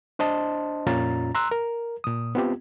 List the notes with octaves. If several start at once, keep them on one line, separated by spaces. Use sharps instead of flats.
D4 C5 D#5 A5 C6
F2 A#2 C#4 F4 A#5 A6
A#5 C6 E6 F#6
A#4
A#2 D#6
B3 C4 F4 G4